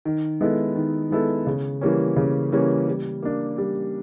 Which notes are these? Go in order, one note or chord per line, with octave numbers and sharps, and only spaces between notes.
D#3
G#3 B3 E4 A4
D#3
G#3 B3 E4 A4
C#3
E3 G3 A#3 C#4
C#3
E3 G3 A#3 C#4
G3
A#3 D4
G3